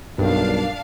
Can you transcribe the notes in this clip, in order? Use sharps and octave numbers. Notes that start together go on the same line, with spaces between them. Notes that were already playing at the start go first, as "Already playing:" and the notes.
B1 G2 D4 A#4 F5